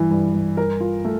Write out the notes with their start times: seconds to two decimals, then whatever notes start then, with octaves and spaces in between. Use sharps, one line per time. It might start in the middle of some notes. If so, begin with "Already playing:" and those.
Already playing: G2 E3
0.11 G2
0.34 G2
0.57 A#4
0.80 F4
1.05 A3